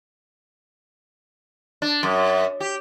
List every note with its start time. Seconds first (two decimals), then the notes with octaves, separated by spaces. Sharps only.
1.82 D4
2.03 F#2
2.60 G4